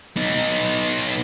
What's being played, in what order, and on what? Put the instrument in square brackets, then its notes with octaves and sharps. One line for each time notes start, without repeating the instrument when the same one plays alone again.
[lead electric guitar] B3 D#4